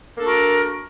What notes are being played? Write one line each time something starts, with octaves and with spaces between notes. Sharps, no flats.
A#3 D4 F#4 A4 A#4